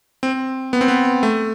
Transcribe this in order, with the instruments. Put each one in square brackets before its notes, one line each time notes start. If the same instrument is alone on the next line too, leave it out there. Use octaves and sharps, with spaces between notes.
[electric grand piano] C4
B3
C4
B3
A3